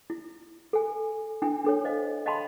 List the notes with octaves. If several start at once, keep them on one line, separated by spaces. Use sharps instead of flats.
E4
A4 G#5
D4 E4 G5 G#5 D#6
D4 A4 C#5
C5 D#5 F5
D#5 F5 G5 A5 B5 C6